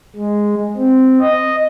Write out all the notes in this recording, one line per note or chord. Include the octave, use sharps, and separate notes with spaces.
G#3
C4
D#5